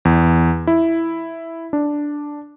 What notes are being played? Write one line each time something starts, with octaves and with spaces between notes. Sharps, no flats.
E2
E4
D4